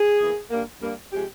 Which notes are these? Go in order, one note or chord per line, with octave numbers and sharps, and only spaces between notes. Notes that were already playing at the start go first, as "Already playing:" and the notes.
Already playing: G#4
E2 E3 A#3
G2 G3 A#3
G2 G3 A#3
C3 F3 G#3 G4